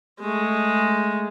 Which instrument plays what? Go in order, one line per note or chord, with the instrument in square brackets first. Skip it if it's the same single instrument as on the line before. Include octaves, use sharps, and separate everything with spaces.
[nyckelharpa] G#3 A3